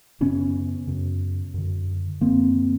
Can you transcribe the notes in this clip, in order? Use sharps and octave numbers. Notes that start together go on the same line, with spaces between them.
F#2 C#3 B3 C#4
F#2 C#3
F#2 D3
F#2 D3 A#3 C4